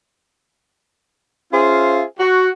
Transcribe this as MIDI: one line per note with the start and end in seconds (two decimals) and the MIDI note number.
1.52 2.04 61
1.52 2.04 65
1.52 2.04 68
1.52 2.04 72
1.52 2.04 76
1.52 2.04 77
2.20 2.49 66